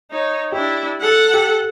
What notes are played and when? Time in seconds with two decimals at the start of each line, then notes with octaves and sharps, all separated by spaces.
0.11 D#4 C#5
0.52 D4 E4 G4
1.01 A4 F#5
1.34 G4